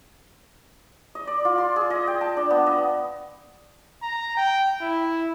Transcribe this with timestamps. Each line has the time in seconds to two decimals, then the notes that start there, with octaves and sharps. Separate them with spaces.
1.15 D#5
1.27 D5
1.45 F4
1.58 C6
1.76 G#4
1.90 D#5
2.07 G5
2.21 A5
2.37 D4
2.50 B3
2.66 D#5
4.02 A#5
4.37 G5
4.81 E4